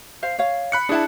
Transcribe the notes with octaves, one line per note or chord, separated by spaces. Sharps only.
C5 F5
C#5 F5
B5 F#6 C#7
D4 E4 G#4 A5